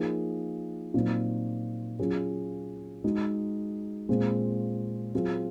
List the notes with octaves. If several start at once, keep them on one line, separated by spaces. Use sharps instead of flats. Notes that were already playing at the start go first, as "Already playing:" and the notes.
Already playing: F3 A#3 D#4 G#4
A#2 F#3 C4 D#4
F#3 C#4 F4 G#4
G#3 D#4 F#4
A#2 G#3 C4 F4 G#4
F#3 C4 F4 G#4